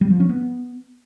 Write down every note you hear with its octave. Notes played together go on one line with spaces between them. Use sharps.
G3
F3
C#4
B3